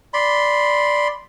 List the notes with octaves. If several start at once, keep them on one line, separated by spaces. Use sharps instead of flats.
D5 B5 C6